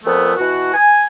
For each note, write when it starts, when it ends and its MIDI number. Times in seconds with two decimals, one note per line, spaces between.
0.04 0.33 41
0.04 0.33 46
0.04 0.33 53
0.04 0.33 57
0.04 0.33 59
0.37 0.73 47
0.37 0.73 52
0.37 0.73 66
0.74 1.04 80